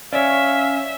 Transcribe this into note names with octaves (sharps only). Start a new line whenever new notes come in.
C#4 C#5 D5 E5 F5